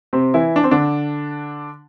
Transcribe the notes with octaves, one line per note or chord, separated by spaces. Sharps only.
C3 C4
E3 E4
D4
C4
D3 D4